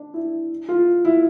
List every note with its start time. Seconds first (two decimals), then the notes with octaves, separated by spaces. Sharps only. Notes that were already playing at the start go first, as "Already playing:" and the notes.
Already playing: D4
0.14 E4
0.69 F4
1.05 E4